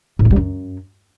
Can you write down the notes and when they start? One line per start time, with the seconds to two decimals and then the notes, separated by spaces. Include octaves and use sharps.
0.19 A2
0.25 F#3
0.31 G3
0.36 F#2